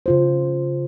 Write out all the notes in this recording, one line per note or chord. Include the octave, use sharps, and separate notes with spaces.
C#3 F4 C5